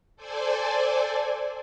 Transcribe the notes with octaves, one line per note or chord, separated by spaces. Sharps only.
A4 C5 D5 G#5